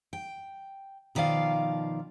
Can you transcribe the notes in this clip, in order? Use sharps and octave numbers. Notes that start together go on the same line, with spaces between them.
G5
B2 D#3 F3 D5 F5